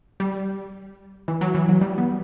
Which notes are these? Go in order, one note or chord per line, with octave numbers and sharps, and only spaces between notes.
G3
E3
F#3
E3
F#3
G3
B3